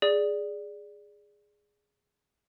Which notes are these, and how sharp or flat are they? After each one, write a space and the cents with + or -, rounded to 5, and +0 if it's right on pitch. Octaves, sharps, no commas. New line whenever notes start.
G#4 -5 D5 +0